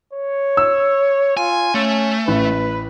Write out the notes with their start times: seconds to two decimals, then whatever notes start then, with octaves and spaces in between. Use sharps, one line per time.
0.13 C#5
0.57 E6
1.37 F4 G#5
1.74 A3 C#4
2.28 A1 B4